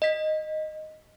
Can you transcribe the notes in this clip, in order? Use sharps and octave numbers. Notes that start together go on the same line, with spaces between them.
D#5 B6